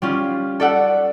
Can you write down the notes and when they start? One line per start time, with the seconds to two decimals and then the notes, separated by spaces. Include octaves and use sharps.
0.02 G3 C#4 F4
0.60 A4 D5 E5 F#5